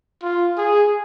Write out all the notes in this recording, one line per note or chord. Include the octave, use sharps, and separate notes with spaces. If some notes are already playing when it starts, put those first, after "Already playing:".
F4
G#4